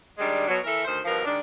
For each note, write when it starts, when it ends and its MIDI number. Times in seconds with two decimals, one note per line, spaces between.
0.18 0.45 51
0.18 0.45 55
0.18 0.45 56
0.18 0.45 62
0.47 0.58 47
0.47 0.58 54
0.64 0.84 52
0.64 0.84 69
0.64 0.84 70
0.64 0.84 76
0.85 0.99 38
0.85 0.99 51
0.85 0.99 72
1.05 1.21 43
1.05 1.21 47
1.05 1.21 53
1.05 1.21 70
1.25 1.39 51
1.25 1.39 56
1.25 1.39 62